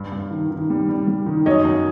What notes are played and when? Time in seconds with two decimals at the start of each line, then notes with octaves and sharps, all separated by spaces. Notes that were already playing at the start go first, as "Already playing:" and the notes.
Already playing: G2
0.12 G2
0.31 D#3
0.51 D#3
0.70 G3
0.89 G3
1.08 G3
1.26 D#3
1.46 F#2 C#5 D#5
1.65 F#2